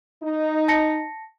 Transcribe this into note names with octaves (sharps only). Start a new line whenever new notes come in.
D#4
A5 A#6 C#7